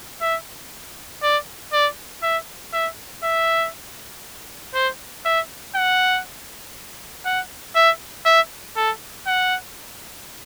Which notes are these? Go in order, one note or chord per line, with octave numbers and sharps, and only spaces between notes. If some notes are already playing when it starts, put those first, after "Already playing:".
E5
D5
D5
E5
E5
E5
C5
E5
F#5
F#5
E5
E5
A4
F#5